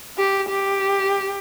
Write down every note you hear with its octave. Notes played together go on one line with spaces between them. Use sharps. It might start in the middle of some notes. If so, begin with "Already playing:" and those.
G4
G4